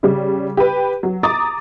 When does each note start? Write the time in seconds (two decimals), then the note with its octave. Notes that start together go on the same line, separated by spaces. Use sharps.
0.03 C#3 G3
0.57 G4 B4
1.03 F#3
1.23 A#5 D6 D#6 A6